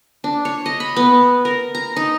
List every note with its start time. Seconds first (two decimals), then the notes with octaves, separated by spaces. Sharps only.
0.24 D4
0.45 C#5
0.66 D#5
0.80 B5
0.96 B3
1.45 A#4
1.75 A#5
1.96 D#4